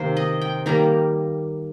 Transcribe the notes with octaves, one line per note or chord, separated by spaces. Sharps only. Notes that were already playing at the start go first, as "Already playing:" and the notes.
Already playing: C3 D#3 A#3 A#4 C5
D#5
G5
D#3 G3 A#3 A#5